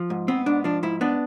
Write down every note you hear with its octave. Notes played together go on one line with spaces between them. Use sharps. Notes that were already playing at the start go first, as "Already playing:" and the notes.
Already playing: F3
G#2
B3 C4
G#2 D4
F3 D4
G#2 E4
B3 D4